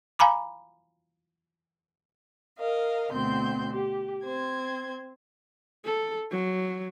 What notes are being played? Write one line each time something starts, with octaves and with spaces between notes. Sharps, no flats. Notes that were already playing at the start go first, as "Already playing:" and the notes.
F5 G#5 A#5 B5 D6
A#4 D#5 F5
D2 B2 C4 C6 G6
G4
C4 C5 G#6
A4
F#3